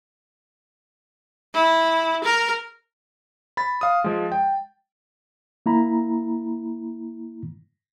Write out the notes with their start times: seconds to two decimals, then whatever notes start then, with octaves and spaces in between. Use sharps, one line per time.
1.54 E4
2.24 A#4
3.57 B5 A6
3.81 F5 D#6
4.04 F3 G#3
4.32 G5
5.66 A#3 E4 A#5 B5